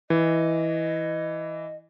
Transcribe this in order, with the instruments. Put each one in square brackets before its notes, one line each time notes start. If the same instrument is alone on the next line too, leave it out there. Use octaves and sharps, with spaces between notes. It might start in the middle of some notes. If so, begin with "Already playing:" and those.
[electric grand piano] E3 [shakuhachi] D#5